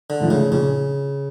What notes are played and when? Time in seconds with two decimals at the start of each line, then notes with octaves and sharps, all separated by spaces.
0.10 D3
0.20 G#2 F3 A3
0.30 C#3
0.51 A#1 C#3